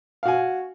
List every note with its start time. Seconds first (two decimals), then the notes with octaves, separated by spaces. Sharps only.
0.23 F5
0.25 F#4
0.28 G#5